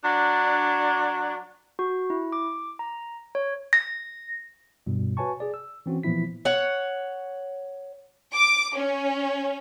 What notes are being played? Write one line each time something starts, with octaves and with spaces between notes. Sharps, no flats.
F#3 D4
F#4
E4
D6
A#5
C#5
A#6
G2 B2 G3
F#4 B4 C#5 G#5 A5 C#6
G#4 D5
E6
E3 C4 C#4 F#4
A#2 E3 F3 B3 E4 B6
C#5 F#5
D6
C#4